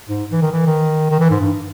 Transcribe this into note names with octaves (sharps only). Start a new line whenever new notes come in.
G#2
E3
D#3
E3
D#3
D#3
E3
G#2
G2